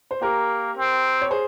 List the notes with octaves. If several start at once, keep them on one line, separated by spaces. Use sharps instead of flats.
C5
A#3 G4 A#4
C4
C#5
G#4 C5